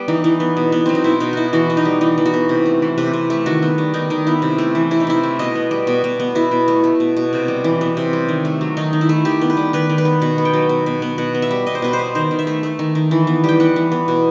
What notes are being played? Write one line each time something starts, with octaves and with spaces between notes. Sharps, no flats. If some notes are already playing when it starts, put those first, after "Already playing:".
Already playing: G3 B3
E3 D#4
E3
B3
B2
B3
F#3 C4
D#4
B2 E4
B2 D#4
B3 E4 F#4
E3 F#4
B3
D#4
G3
E3 D#4
E3
F#4
B3
C3
A3
E3
C3 B4
C3
A3
D#3 F#4
B3
G3
D#3 D#4
D#3 D#4
B3 E4
C3
A3
E3
C3 E4
D#4
C3 E4
A3
B2 D#5
B3
G3
B2
B2
B3
B2 E4
B2
A3
A3
B2
B2
C3
G3
E3
B3
C3
G3
D#3
A3
F#3
D#3 D#4
D#3
E4
A3
D#3 G4
B3
B4
G3
D#3 B4
D#3
B4
B3
B2 F#5
B3
G5
F#3
B2
B2
B3
B2 F#5
B3
E5
G3
B2 D#5
C5
B2 B4
C5
B3
D#3 C5
D#3
E5
A3
A3
D#3
D#3
E3
B3
G3 G5
E3 F#5
E3
B3
B2